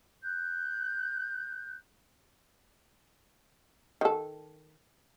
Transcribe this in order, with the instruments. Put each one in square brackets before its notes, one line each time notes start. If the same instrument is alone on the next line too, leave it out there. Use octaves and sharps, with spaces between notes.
[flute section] F#6 G6
[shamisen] D#3 A4